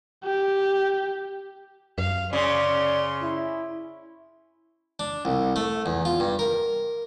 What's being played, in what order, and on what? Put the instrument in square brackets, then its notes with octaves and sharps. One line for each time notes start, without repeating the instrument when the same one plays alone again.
[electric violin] G4
[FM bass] F#2 [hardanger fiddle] F5
[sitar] C#3 [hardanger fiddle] C#4 C6 [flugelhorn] D5
[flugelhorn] E4
[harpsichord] D4
C2
A3
E2
F4
G2
A#4